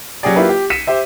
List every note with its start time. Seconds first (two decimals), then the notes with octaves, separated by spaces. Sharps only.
0.23 F#3 C#4 G4 G#4 D5
0.36 A#3 E4 F4 G4 B4
0.49 G4
0.70 B6 C#7 D#7 E7
0.87 G4 C5 E5